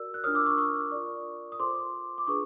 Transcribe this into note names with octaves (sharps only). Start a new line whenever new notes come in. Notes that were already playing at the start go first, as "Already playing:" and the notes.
Already playing: F#4 A#4 D5 E6
F#6
D4 F4 A#4 C#5 D#6 F6
D6 E6
C#6 D#6
C#6 D#6
F4 A#4 D5
D#6
F4 A4 C5 C6 D6
D6
D4 F4 G#4 B4 C#6 D#6